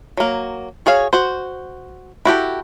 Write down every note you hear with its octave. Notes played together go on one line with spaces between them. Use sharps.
F#3 A#3
F#4 G#4 C#5 F5
F#4 C5
E4 F#4 G4 A4